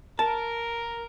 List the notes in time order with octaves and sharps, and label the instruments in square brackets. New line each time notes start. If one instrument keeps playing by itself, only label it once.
[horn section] A#4 [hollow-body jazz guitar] A5